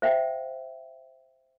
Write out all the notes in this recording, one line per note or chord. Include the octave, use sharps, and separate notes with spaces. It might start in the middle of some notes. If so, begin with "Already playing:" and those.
C5 E5 F5 G5